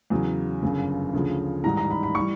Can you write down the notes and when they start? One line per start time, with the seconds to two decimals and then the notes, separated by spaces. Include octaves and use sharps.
0.10 E2 C#3 F#3
0.62 G1 F#2 C#3
1.14 D2 C#3 F3
1.64 A1 G#2 D#3 G3 A#5
1.77 A#5
1.90 B5
2.03 B5
2.15 E3 G3 C#6